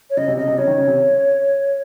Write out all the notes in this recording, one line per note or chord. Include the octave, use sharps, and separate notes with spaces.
C#5
C#3 D#5
C3
C#3 D#5
C3
C#3 C#5
D#3
C#3
C3